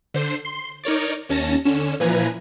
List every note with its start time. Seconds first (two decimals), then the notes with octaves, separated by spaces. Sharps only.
0.14 D3 C5 C7
0.45 C6
0.84 D#4 A#4 C#5 D5
1.29 D#2 C#4 A5 A#6
1.65 D3 C#4 E7
2.00 A#2 E3 F3 B4 G#5 A#5